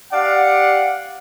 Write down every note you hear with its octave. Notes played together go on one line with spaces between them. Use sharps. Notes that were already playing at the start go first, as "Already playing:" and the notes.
G4 D5 F5 F#5